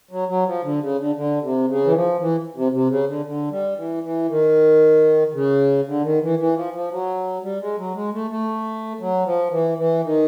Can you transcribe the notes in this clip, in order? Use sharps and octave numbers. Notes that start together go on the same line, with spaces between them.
F#3
F#3
F3
D3
C#3
D3
D3
C3
C#3
E3
F3
E3
C3
C3
C#3
D3
D3
G3
E3
E3
D#3
C#3
D3
D#3
E3
E3
F3
F3
F#3
G3
G#3
F#3
G#3
A3
A3
F#3
F3
E3
E3
D#3